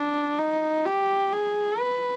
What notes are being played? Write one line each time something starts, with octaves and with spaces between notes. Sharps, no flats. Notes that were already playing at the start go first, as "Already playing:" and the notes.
Already playing: D4
D#4
G4
G#4
B4